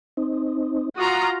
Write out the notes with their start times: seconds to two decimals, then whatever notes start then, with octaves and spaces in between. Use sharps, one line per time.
0.17 C4 D#4
0.97 F4 F#4 A#5 D#6